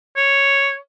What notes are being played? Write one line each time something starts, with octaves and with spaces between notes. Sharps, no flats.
C#5